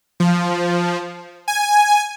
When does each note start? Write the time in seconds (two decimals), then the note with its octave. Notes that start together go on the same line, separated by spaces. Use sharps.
0.20 F3
1.48 G#5